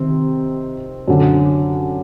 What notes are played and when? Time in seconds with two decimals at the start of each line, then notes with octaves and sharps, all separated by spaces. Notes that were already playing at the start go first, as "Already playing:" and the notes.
Already playing: C3 D#3 C4
1.08 F#2 D3